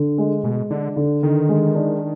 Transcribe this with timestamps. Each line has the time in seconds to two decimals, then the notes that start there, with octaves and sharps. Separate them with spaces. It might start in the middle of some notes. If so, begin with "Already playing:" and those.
Already playing: D3
0.18 G#3
0.44 B2 G#3
0.70 D3 D4
0.96 D3
1.23 D3 D#3
1.49 G#3
1.75 D4